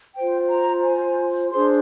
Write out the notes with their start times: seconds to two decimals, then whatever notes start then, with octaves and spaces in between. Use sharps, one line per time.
0.15 F4 C5 G5
0.49 A#5
0.84 G#5
1.51 D4 G#4 C5 C6